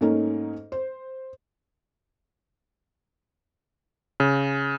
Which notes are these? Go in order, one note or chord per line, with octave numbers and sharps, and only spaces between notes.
G#2 A3 A#3 C#4 D#4
C5
C#3